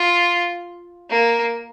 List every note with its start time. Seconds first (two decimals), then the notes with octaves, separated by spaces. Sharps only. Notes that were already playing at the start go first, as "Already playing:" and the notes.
Already playing: F4
1.10 A#3